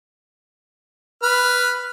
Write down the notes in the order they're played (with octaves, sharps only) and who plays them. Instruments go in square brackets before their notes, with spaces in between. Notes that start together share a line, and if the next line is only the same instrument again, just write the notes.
[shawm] B4 [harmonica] B5 F6